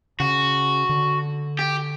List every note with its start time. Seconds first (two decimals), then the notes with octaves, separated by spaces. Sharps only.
0.20 C#3 F#4
0.89 D3
1.59 G4